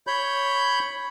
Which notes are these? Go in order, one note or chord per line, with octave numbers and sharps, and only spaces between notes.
C#5 B5 G6